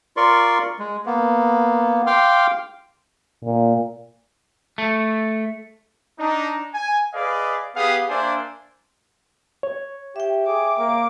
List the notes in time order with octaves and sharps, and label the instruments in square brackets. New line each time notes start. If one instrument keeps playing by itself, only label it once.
[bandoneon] F4 A#4 D5 C6 C#6
G#3
A#3 B3
F5 G5 C6 D6 F6
[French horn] A#2
[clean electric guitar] A3
[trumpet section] D4 D#4
G#5
G#4 B4 D5 D#5 F5
B3 G4 G#4 F5 F#5 D#6
A#3 D4 C5 D5 E5 G#5
[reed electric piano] C#5
[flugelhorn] G4 [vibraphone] E5 G5
[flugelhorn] G#4 [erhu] D6
[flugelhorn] A#3 [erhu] D6